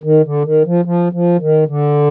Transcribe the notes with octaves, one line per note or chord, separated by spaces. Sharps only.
D#3
D3
D#3
F3
F3
F3
D#3
D3